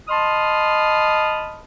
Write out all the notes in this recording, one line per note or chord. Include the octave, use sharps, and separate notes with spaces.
D#5 A5 B5 C6 D#6 F6